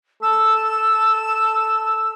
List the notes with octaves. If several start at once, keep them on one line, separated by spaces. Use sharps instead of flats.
A4 E6